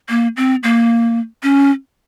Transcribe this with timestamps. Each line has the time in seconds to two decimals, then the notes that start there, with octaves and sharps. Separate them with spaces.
0.09 A#3
0.37 C4
0.63 A#3
1.43 C#4